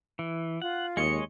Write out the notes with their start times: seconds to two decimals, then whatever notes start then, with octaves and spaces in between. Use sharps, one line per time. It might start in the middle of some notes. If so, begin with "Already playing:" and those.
0.19 E3
0.62 F4 F#5
0.97 D#2 G#3 C#5 D#5 C#7